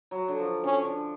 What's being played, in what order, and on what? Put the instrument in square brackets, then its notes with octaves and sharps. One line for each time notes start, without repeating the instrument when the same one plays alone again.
[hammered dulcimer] F#3
D3
F3
[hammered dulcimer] D3 [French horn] C#4
[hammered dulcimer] D3